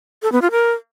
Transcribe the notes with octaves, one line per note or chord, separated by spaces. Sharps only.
A4
B3
F4
A#4